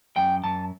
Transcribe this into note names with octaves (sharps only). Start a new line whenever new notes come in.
F#2 G5
F#2 A5